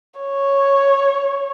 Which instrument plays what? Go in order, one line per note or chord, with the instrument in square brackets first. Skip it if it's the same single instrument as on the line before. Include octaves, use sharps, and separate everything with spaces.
[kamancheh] C#5